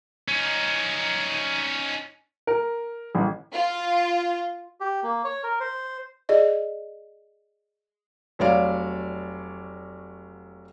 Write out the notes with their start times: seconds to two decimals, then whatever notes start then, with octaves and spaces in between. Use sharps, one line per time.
0.28 C#4 D#4
2.47 A#4
3.15 A1
3.53 F4
4.80 G4
5.03 A#3
5.24 C#5
5.43 A#4
5.60 C5
6.29 G#4 D5 D#5
8.39 F1 F#3 F#4 C#5 D5 F5